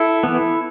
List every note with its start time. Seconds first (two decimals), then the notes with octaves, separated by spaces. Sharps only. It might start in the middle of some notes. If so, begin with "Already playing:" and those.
Already playing: E4 A4
0.23 E3 B3